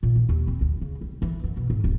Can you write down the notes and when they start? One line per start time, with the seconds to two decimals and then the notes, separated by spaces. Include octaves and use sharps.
0.03 A#2
0.16 D#3
0.29 D#2
0.47 C4
0.61 D2
0.81 C#3
1.01 G3
1.22 E3
1.44 F#2
1.57 B2
1.70 G#2
1.84 D1